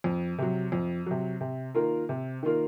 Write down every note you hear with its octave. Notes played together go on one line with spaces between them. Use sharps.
F2
C3 F#3
F2
C3 F#3
C3
D#3 A#3 F4 A#4
C3
D#3 A#3 F4 A#4